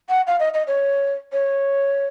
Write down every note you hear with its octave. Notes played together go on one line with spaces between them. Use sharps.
F#5
F5
D#5
D#5
C#5
C#5